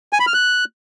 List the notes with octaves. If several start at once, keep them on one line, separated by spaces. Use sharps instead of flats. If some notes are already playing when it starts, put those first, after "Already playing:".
G#5
B5
F6
F#6